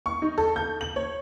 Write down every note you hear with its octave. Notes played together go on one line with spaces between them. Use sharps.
C#6
D#4
A4
G6
F#7
C#5